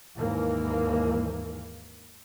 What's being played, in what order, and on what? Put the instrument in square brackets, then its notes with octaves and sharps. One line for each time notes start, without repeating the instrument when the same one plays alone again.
[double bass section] D#2 G#2 E3 A#3